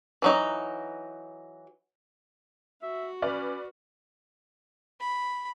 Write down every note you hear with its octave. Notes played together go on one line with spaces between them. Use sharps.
E3 F#3 D#4
F#4 E5
C#4 B4 D5 F6
B5